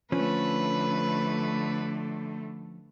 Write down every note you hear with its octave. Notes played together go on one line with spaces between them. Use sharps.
D3 F3 A3 C#4 B4